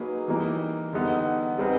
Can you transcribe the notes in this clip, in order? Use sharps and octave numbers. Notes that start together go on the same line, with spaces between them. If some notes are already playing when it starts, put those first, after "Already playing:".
Already playing: F#3 A#3 D#4 G#4 B4
E3 G3 A#3 D#4
D3 G3 B3 D#4
G3 C4 D#4 G#4 B4